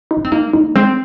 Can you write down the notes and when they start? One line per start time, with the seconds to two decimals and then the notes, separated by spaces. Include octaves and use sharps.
0.11 D#4
0.17 C#4
0.25 C4
0.32 A#3 D#4
0.53 A#3 D#4
0.75 G#3 C4